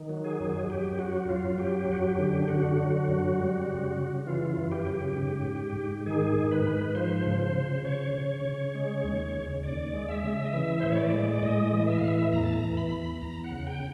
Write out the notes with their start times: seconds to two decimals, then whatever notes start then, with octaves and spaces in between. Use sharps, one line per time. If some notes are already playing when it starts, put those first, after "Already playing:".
Already playing: D#3
0.09 F#3
0.25 G#4
0.40 F#2
0.70 F#2 G4
0.95 G4
0.99 F#3 F#4
1.28 F#2 F4
1.58 F#3 G4
1.89 F#2 F#4
2.04 G4
2.19 D3
2.42 G4
2.48 D3 F#4
2.79 F#3
3.08 F#2
3.38 G3
3.67 C#3
3.97 C#3
4.27 E3 F4
4.57 F#2
4.72 G4
4.87 C#3
5.16 G#2
5.46 G#2
5.76 G#2
6.06 D#3 G#4
6.36 G#2
6.51 B4
6.65 G#2
6.95 F3 C5
7.26 C#3
7.40 C5
7.55 C#3
7.85 C#3 C#5
8.14 C#3
8.45 C#3
8.75 G#3
9.04 D#2
9.33 C#3
9.63 D#2 D5
9.93 G#3
10.08 E5
10.24 C#3
10.45 D#5
10.53 E3 E5
10.80 A2 C5
10.90 C#5
10.98 D5
11.13 G#3
11.31 D5
11.42 A2 D#5
11.73 E3
11.87 E5
11.98 A2 F5
12.08 E5
12.32 E2 A#5
12.43 A5
12.53 A#5
12.62 E3
12.77 B5
12.91 E2
13.21 E2 A#5
13.44 F#5
13.51 C#3
13.67 G5